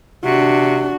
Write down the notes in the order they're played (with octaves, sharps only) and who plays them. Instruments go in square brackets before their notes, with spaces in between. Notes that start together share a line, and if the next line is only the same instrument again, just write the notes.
[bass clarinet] C3 [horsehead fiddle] D4 F#4